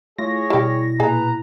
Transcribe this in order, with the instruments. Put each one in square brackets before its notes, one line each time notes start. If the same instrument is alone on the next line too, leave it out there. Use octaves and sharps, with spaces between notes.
[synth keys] A3 E4 F4 [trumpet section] G#4 C#5 [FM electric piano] A#6
[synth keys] B2 E4 [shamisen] G3 G4
[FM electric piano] A#2 [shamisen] G#4 G#5 [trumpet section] B4 A#5